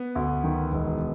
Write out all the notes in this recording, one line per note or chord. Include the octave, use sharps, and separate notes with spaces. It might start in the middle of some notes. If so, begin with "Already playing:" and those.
Already playing: B3
D2
D#3
E1